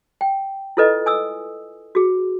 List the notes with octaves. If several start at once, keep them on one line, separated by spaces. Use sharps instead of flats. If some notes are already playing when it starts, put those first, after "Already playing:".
G5
E4 F4 A4 B4 D#5
G#5 D#6 E6
F#4 G#4